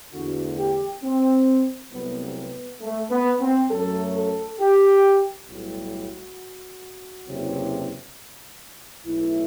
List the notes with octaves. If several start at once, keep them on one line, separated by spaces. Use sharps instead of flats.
E2 D3 A3 F#4
G4
C4
C2 C3 F#3 A3 B3
B3
A3
B3
C4
F#2 F#3 A3 A4
A4
G4
B1 A2 G3 F#4
F#1 E2 C3 F#3
B1 A2 E3 A3 E4